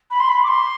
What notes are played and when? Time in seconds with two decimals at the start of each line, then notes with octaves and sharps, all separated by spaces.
0.11 B5
0.20 C6
0.30 B5
0.44 D6
0.49 C6